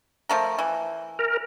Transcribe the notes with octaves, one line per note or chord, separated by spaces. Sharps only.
F3 A3 A#4
E3
A#4